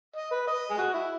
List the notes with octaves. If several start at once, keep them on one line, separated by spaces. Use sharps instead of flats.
D#5
B4
D#5
G#4
F#4
E4